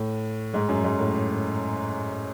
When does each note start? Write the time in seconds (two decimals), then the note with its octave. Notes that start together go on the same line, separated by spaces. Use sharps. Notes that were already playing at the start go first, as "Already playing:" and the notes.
Already playing: A2
0.54 G#2
0.69 F#2
0.84 G#2
0.99 A2